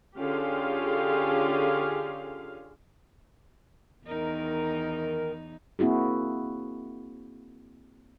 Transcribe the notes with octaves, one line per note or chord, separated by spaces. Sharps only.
D3 C#4 F4 G4 G#4 F5
E2 D#3 D#4 A#4
A#3 C4 E4 F#4 G#4